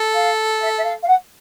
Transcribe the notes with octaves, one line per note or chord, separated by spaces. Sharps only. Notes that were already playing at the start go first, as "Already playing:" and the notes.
Already playing: A4
F5
E5
E5
F5
F5
F#5